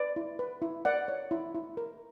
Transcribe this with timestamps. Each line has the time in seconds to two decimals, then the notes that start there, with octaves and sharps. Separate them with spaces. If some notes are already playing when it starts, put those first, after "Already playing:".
Already playing: B4 D5
0.16 E4
0.39 B4
0.62 E4
0.85 A#4 D5 F#5
1.08 C#5
1.31 E4
1.55 E4
1.77 A#4